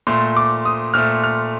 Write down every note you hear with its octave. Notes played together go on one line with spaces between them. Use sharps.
A#2 A3 C6
D6
D#6
A#2 A3 F6
F6